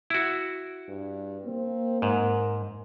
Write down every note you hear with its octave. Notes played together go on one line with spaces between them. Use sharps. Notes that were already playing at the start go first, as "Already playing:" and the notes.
E4 F#4
G2
A#3 C4
G#2 A#4